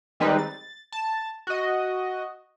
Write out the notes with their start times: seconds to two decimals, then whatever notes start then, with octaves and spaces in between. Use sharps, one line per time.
0.20 D#3 G3 G#3 C4 D#4 B4
0.38 A6
0.92 A5
1.47 F#4 D#5